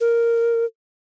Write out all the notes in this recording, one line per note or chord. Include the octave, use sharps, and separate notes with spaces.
A#4